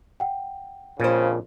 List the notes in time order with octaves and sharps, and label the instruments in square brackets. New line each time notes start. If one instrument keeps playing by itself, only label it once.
[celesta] F#5 G5
[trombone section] A#1 F2 C#3 [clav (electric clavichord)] A#2 [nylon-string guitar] C#4 C5